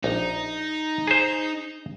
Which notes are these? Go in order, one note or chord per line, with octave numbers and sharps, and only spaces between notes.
A#1 D#4
G#4 C5